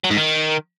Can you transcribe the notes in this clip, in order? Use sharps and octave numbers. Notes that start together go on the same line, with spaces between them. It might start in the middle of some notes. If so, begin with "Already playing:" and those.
F#3
G#2
D#3